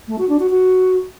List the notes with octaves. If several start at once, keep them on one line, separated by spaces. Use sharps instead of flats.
A3
F#4
D4
F#4
F#4